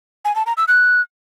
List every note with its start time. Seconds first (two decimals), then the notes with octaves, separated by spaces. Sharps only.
0.25 G#5
0.36 A5
0.46 A#5
0.57 E6
0.68 F#6